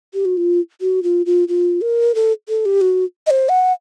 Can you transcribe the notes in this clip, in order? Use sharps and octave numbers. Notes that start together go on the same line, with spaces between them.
G4
F#4
F4
F#4
F4
F4
F4
A#4
A4
A4
G4
F#4
D#5
C5
F#5